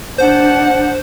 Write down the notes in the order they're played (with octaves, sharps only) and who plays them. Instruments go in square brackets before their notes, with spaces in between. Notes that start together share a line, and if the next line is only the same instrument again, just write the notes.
[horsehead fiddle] D4 F#5 [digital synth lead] C5